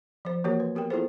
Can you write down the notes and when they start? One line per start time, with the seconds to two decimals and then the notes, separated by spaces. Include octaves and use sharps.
0.25 F3 C5
0.44 E3 A#3 F#4 G4 A#4 C#5
0.60 B4
0.75 B3 G4 A#4 G5
0.90 B3 E4 F4 G#4 A4 C5